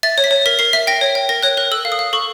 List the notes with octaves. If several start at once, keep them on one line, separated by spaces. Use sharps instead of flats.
E5 A6
C#5
B6
C#5
A#4 B6
A#4 C7
E5 B6
G5 A#6
C#5
G5
A#4 A#6
C#5 F#6
A#4 F#6
A4 E6
F5
D#6
F5
A4 C#6